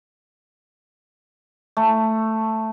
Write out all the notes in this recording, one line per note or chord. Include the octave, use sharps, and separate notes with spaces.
A3